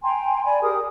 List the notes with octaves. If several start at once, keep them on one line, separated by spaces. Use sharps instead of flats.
G5 G#5 A#5 C6
D5 G#5 B5
G4 G#4 A#4 D#6